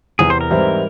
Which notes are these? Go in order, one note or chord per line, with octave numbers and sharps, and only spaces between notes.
E2 C3 E3 G#4
C5
A#4
G#2 E3 G3 C4 E4